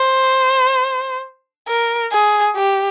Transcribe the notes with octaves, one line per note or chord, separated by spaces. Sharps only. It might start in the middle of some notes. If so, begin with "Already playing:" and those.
Already playing: C5
A#4
G#4
G4